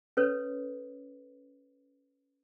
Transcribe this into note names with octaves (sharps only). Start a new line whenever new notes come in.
C#4 A4 B4 C#5